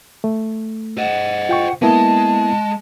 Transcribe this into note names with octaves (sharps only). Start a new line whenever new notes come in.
A3
C5 D#5 F#5
F4 G5 C#6
G#3 A#3 B3 E4 A5